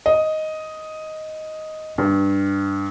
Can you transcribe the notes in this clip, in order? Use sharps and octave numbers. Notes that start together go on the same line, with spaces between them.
D#5
G2